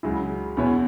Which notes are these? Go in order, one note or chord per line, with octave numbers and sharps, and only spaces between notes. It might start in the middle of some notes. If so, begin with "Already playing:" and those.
C#2 C#3 F#3 E4 G#4
E2 B2 B3 E4 C#5